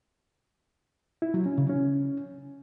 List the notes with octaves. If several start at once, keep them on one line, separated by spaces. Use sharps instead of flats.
E4
F#3
C#4
C#3
C#4